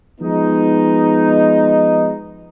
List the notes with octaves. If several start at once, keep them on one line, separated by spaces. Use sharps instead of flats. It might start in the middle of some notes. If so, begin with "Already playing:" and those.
F3 G#3 B3 D#4